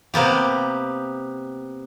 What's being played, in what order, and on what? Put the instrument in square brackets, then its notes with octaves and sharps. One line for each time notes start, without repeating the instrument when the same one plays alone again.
[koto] C3 A#3 B3 G4